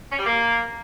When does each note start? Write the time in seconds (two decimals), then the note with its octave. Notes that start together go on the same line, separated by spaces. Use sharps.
0.12 C#4
0.19 G3
0.26 A#3